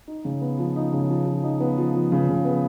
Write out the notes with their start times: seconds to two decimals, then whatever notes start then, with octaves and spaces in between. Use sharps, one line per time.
0.08 D#4
0.25 C#3
0.42 B3
0.59 F3
0.76 D#4
0.93 C#3
1.09 F3
1.26 F3
1.44 D#4
1.61 B3
1.78 F3
1.95 F3
2.12 C#3
2.29 C#3
2.45 B3